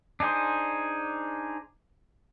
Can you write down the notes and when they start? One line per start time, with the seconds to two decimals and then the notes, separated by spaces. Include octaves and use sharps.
0.20 D4 D#4 G#4 C5